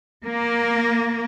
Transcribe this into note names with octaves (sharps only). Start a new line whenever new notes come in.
A#3